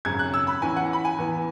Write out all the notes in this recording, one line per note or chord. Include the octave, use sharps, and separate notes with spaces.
G#1 F#2 C#3 G#6
F#6
E6
B5
E2 E3 C#4 G#5
F#5
B5
G#5
E2 E3 B3